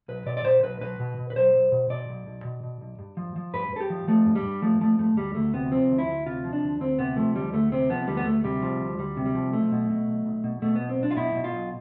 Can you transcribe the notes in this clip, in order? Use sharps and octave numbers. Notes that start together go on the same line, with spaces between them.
B1 B4
B2 D5
D5
B2 C5
B1 B4
B1 B4
B2
B2
B4
B1 C5
B1
B2
B2 D5
B1
B1
B2
B2
B1
G2
F3
F3
G2 B4
G2 A4
G4
F3
F3 A3
G2
G3
G2
F3 A3
F3 A3
G2 A3
D2 G3
D2 A3
C3 B3
F3 C4
D2
E4
D2
C3 F4
F3
D4
D2
D2 C4
C3 B3
F3 A3
D2 G3
D2 A3
C3 C4
F3 B3
D2 G3
B3
D2 A3
C3 G3
F3
D2
D2 G3
C3
G3
F3
B1 A3
B2
B2
B1
B1
B2
B2 A3
B1 B3
C4
B1 D4
F4
B2 E4
B2
F4
B1